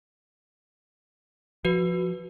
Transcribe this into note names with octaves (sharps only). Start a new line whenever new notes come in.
F3 F#4 B4